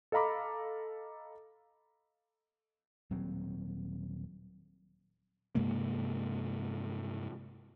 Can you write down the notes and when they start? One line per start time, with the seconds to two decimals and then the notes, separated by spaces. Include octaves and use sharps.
0.12 A4 D#5 F5 A#5 B5 D6
3.11 D#1 F#3 C4
5.55 G2 C3 G#3 A#3